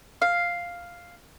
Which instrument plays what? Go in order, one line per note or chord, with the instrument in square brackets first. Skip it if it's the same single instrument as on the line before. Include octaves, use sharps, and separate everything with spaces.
[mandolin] F5